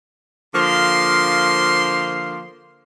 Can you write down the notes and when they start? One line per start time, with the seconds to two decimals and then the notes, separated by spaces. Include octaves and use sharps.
0.54 D3 F3 A#3 C6